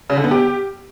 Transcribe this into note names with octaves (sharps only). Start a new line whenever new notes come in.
C#3
D3
B3
G4